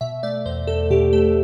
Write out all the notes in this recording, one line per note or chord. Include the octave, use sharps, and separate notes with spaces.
B2 E5
A3 D5
E2 C5
E2 A4
B2 G4
A3 A4